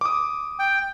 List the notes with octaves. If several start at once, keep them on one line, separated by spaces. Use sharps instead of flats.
D6 D#6
G5